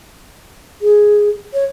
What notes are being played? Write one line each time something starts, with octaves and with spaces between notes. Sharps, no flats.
G#4
C#5